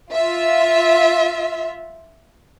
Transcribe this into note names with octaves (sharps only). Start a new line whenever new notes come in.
F4 E5